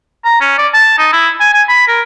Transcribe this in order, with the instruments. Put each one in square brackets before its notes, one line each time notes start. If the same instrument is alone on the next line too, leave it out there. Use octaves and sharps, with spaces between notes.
[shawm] A#5
C#4
D5
A5
D#4
E4
G#5
G#5
B5
A#4